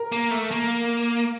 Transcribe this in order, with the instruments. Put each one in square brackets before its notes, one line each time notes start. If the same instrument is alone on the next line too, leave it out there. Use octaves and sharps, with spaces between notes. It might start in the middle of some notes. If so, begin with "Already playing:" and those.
Already playing: [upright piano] A#4 A#5
[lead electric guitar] A#3
A3
A#3